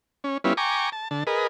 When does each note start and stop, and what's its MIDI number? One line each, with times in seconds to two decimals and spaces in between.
0.24 0.38 61
0.44 0.53 55
0.44 0.53 59
0.44 0.53 61
0.44 0.53 64
0.44 0.53 65
0.57 0.90 79
0.57 0.90 80
0.57 0.90 82
0.57 0.90 85
0.57 0.90 86
0.92 1.08 81
1.11 1.24 50
1.11 1.24 81
1.27 1.47 68
1.27 1.47 70
1.27 1.47 71
1.27 1.47 75